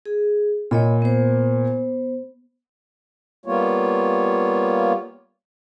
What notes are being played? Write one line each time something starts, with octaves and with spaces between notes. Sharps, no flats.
G#4
A#2 C#5 D#5 B5
B3 C5
G3 A#3 B3 F4 C#5